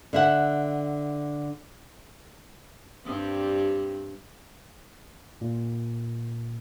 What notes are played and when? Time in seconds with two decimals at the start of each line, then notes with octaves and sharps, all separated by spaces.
0.13 D3 E5 F#5
3.05 G2 G3 C4
5.41 A#2